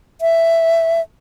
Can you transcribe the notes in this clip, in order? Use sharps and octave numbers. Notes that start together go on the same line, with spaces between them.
E5